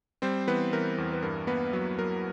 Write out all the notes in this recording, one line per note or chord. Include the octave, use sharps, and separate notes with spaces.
G3 C4 C5
E3 B3 B4
E3 A#4
E2
B4
G2 A#4
A#3 B3 B4
F#3
F#3 A#4